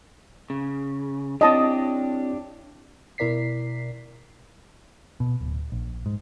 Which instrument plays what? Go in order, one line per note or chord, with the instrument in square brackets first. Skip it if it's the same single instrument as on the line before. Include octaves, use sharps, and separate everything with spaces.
[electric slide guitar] C#3
[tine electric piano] C4 E4 C#5 [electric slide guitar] D4 G4 [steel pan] D#5 A5 D#6
[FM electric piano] B2 E4 A#4 D5 B6 C7
[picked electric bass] B2
D1
A#1
G#2